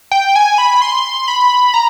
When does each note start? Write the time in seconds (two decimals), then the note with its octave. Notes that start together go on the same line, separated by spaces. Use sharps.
0.11 G5
0.36 G#5
0.58 B5
0.82 C6
1.28 B5
1.74 A#5